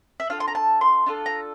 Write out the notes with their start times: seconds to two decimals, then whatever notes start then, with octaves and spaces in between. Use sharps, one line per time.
0.20 E5
0.29 D4 F4 A4 F5
0.40 C6
0.48 A#5
0.55 A5
0.81 C6
1.06 D4 F4 A4
1.26 A#5